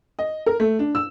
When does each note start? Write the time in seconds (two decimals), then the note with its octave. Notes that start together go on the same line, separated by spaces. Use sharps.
0.19 D#5
0.46 A#4
0.60 A3
0.79 D4
0.95 E6